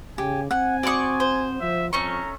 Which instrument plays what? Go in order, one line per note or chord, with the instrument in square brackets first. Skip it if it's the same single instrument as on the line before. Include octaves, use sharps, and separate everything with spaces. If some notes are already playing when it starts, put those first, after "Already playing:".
[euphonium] C#3 [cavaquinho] G4 [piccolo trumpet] G#5
[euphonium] C4 [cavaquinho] F#5 [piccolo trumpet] G#5
[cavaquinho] F#4 C6 D#6 [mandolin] D5 C#6
[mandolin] C5
[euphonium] F3 [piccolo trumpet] E5
[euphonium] F2 [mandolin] A3 C#4 C#6 [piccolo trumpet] A#5